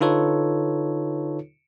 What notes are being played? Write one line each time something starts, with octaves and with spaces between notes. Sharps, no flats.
D3 D#4 F4 A4 B4 C#5